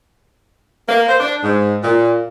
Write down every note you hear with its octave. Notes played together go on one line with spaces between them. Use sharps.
A#3
C5
D4
G#2
A#2